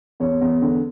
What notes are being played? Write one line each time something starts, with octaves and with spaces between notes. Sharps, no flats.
E2 C#5
E2
D3